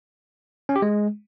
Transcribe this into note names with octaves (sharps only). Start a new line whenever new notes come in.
C#4
G4
G#3